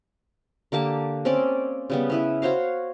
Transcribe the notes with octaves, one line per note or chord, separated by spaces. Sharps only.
D3 A#3 G4 A5
C4 C#4 D5
C#3 G3 B3
C#4 E4 B4
F#4 C5 C#5 F5